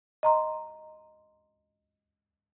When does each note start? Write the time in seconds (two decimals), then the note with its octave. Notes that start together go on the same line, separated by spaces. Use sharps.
0.23 D#5 A#5 C6